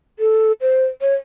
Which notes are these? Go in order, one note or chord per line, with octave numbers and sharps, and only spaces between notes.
A4
C5
C#5